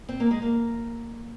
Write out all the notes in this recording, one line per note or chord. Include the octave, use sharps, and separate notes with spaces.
C4
A#3
G#3
A#3